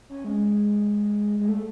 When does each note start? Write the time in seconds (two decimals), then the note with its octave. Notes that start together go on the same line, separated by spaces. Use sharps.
0.09 C#4
0.24 G#3
1.39 G#3
1.49 A3